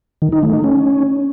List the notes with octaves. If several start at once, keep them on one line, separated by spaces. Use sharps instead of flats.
D#3
D#4
A3
D#4
C#4